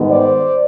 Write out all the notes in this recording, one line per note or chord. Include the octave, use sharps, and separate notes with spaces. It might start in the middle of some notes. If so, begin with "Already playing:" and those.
Already playing: G#2 D#3 G3 B3
C5 D5